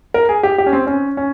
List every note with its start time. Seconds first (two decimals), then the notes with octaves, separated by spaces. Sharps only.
0.14 A#4
0.29 G#4
0.43 G4
0.58 G4
0.66 C#4
0.73 C4
0.87 C#4
1.17 C#4